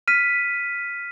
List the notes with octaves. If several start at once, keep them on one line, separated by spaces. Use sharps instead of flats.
F6 B6 D#7